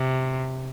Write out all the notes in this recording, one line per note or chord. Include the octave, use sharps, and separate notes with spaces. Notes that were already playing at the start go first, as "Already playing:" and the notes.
Already playing: C3